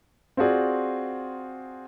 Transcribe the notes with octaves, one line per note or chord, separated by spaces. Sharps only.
C4 F4 F#4 G#4 D5